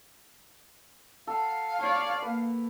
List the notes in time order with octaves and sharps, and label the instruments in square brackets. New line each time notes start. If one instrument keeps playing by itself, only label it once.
[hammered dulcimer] A4 F#5 [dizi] F5
[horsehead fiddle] C#5 D5
[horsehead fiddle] A#3 [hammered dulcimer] B4